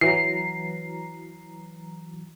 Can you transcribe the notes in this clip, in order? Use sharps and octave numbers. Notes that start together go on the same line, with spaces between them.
E3 F#3 A#5 C7